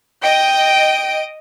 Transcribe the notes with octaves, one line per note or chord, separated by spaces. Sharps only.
D#5 G5 D7